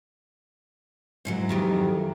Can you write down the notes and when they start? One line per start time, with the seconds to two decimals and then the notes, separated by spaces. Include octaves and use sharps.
1.25 G#2 E3 F#3
1.49 F2 D#3 G4